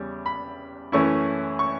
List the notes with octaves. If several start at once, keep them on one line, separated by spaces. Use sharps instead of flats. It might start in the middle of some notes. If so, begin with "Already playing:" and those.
Already playing: E2 C#3 G3 C#4
B5
F#2 E3 A3 C#4 E4 C#6
C#6